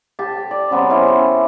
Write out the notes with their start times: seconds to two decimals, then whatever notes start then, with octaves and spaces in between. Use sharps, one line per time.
0.19 G4 A5
0.51 D5
0.71 C#3 F#3 B3 C4
0.90 E3 C#4 E4 G4
1.08 C6